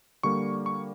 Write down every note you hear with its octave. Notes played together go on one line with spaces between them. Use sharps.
D3 G3 A#3 C#6
C#6